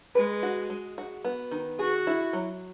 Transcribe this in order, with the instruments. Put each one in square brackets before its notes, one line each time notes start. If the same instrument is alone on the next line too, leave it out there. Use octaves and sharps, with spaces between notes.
[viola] G#3 [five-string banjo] B4
[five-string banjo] F#4
G#3
F#4
B3
D#3
[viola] F#4 [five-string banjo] G#4
[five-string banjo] E4
F#3